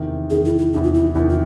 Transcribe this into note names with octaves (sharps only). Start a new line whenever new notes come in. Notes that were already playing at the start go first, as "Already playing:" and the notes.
Already playing: E2 C3 D#3
E2 C3 D#3 G#4
E4
E4
E2 C3 D#3 D#4
F4
E4
E2 C3 D#3 E4
F4